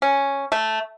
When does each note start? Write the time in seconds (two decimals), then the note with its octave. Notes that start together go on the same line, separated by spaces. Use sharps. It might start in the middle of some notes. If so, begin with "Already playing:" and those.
0.02 C#4
0.52 A3